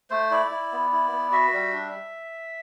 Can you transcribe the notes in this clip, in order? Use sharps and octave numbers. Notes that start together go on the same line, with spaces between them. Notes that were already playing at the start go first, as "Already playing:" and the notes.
A3 C5
E4 D5
E4
B3
E4
B3
F#4 E5
G3
D4